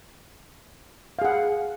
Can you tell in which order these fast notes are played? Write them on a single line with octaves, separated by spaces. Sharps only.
F5 G#4 F#5